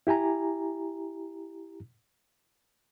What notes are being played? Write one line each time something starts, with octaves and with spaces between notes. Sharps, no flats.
E4 G4 G#5 A#5